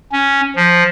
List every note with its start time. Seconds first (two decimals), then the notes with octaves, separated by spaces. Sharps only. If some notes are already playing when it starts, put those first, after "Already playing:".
0.12 C#4
0.56 F3